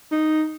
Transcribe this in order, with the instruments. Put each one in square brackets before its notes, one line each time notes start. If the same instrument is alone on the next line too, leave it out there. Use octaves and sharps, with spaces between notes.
[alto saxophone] D#4